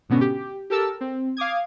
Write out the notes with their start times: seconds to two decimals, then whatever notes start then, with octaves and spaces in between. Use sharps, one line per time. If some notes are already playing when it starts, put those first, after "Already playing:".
0.09 G#2 B2 D3 B3 C#4 F#4
0.21 G4
0.70 G4 A4 A#4 A5 E6
1.01 C4
1.37 F5 D6 D#6 G#6